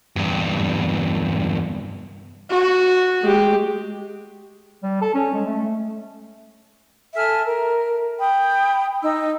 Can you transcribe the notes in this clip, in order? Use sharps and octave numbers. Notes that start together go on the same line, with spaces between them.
E2 G2
F#4
G#3 G4
G3
A4
C#4
G#3
A3
A4 E5 G#5 F6
A#4
G5 B5 D#6
D#4 E6